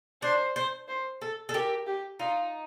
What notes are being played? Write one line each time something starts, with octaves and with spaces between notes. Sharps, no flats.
D4 C5
C5
C5
A4
A4
G4 A#4
G4
D#4 F4